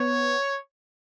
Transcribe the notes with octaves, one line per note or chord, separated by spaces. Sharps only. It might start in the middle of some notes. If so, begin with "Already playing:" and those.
Already playing: B3 C#5